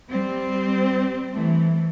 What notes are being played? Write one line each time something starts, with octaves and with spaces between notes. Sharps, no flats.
G3 C4
E3 A3